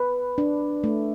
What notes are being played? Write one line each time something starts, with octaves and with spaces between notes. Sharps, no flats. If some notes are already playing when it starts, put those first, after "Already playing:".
Already playing: B4
D4
A3